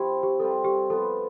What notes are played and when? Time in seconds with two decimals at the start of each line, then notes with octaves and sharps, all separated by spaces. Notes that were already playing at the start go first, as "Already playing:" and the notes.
Already playing: F3 C4 E4 G4
0.23 G4
0.40 C3 G3 C4 F4 A4
0.65 G4
0.90 F3 B3 F4 A4